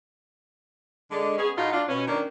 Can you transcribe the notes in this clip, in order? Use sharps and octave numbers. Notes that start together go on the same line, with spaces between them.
D3 G#3
B3 C#4 G#4
A2 D#4 F4 F#4
D4 F4
B2 C#4
D#3 A#3 C#4 D4